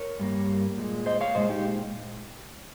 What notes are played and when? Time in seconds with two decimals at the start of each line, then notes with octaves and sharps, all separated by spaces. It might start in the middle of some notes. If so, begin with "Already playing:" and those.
Already playing: A#4 C#5
0.19 G2 G3 A#3
0.77 A#2 G#3
1.06 C5 D#5
1.21 C#5 F5
1.35 A#2 G#3 C5 D#5
1.50 D#4 G4